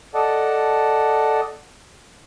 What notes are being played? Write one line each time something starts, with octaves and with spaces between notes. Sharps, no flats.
A4 D5 D#5 F#5 A5